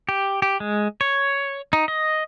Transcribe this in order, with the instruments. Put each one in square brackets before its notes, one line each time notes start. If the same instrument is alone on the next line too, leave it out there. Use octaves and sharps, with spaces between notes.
[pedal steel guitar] G4
G4
G#3
C#5
D#4
D#5